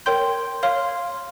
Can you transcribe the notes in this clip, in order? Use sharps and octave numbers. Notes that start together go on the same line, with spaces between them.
A#4 C#5 G5 C6 G6
C#5 F5 C6 F6